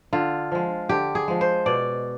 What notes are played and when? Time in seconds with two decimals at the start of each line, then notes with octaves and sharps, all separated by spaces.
0.13 D3 F4
0.52 F3 G#3
0.89 D3 G4
1.15 G#4
1.28 F3 G#3
1.41 C5
1.66 B2 D5